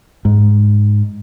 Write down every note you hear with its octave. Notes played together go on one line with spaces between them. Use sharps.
G#2